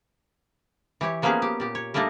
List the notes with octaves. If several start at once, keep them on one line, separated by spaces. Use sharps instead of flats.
E3 G4 C#5
F3 A#3 B3 C#4 G#4 B4
G4
A#2 G4
C#5
G3 A3 A#3 D4 D#4